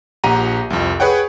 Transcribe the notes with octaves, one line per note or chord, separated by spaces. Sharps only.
A#1 G4 F#5 A#5 D#7
C2 F2
G#4 B4 C#5 F#5 G5